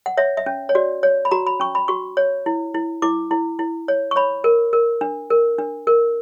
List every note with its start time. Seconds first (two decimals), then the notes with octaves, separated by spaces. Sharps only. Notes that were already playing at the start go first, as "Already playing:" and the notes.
0.06 F#5
0.17 C#5 E5
0.37 E5
0.46 C#4
0.69 C#5
0.75 F#4 D5
1.03 C#5
1.25 B5
1.31 F#4 A#5
1.47 B5
1.60 C#4 C#6
1.75 B5
1.88 F#4 C#6
2.17 C#5
2.46 E4
2.74 E4
3.02 E4 D6
3.31 E4
3.59 E4
3.88 C#5
4.11 C#6
4.16 C#5 B5
4.44 A#4
4.73 A#4
5.01 D4
5.30 A#4
5.59 D4
5.87 A#4